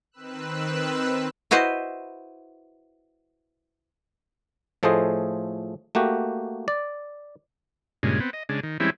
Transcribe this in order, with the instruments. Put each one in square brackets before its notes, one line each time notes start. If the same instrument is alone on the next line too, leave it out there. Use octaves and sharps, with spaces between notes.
[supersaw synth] D#3 C4 B4 E6 F#6
[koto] E4 F#4 B4 C5 D#5
[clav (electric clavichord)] A2 F3 A3 G#4 C5 D#5
A3 A#3 F#4 G4
D5
[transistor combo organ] G2 A#2 C#3 G#3
B3 C4
D#5
C#3 G#3 D4
D#3
E3 G3 G#3 C4 C#4 E4